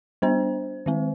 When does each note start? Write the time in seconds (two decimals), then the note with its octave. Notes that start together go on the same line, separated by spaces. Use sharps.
0.22 G3 B3 D4 C5
0.86 D#3 G#3 C4